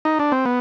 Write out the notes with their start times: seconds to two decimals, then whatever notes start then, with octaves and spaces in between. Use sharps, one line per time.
0.05 D#4
0.19 D4
0.32 C4
0.45 B3